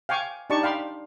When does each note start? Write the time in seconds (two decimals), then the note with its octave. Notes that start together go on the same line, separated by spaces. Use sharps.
0.09 F5 G5 G#5 C#6 D6
0.50 D4 D#4 G4 D5 A5 C#6
0.63 F5 G5 B5 C6